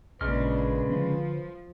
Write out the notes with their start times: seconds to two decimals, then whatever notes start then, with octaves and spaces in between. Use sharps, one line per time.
0.21 A1 A#2 C#3 G#3 D4 B4 F6
0.89 D3 F3